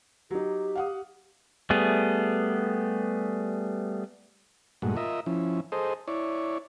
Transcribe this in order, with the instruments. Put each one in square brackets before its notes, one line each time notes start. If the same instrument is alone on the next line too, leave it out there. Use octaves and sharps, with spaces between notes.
[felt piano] F#3 D#4 [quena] G4
[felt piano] F5 F#5 D#6
[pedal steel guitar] G3 A3 B3 G#4
[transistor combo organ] G2 A#2 G#3 A3 F#4
F4 A#4 D#5 E5
F3 C#4 E4
G#4 A4 C5 D#5
E4 C#5 D5